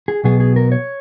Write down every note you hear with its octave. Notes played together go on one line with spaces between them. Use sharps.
G#4
B1 B2 F#3 B3 G#4
G#4
A#4
C#5